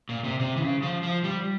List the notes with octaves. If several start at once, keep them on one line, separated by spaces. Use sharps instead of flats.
A#2
C3
C3
E3
C#3
F3
F3
G3